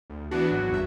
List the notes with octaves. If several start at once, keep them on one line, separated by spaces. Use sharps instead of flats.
D2
E3 B3 D4 F#4
G#1 F#3
E2 G2 E5